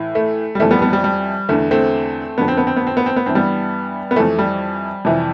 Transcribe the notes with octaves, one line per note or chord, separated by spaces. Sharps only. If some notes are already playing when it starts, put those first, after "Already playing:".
Already playing: A2 E3
A3
G3
F2 E3 A3
G3 B3
G3 B3
G3
G3
E2 D3 A3
A3 C4
F2 D3 B3
C4
B3
C4
B3
C4
B3
C4
B3
G2 E3 C4
G3 B3
B3
F2 E3 A3
G3
F2 C3 E3